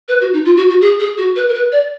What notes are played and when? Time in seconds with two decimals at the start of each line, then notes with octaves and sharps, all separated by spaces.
0.08 B4
0.21 F#4
0.33 D#4
0.45 F4
0.57 F#4
0.69 F#4
0.81 G#4
1.00 G#4
1.18 F#4
1.36 B4
1.49 A#4
1.54 B4
1.72 D5